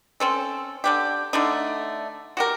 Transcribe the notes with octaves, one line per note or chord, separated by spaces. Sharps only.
C4 C#4 A4
D3 D4 G4
D3 A3 D4 D#4
F#4 G4 A#4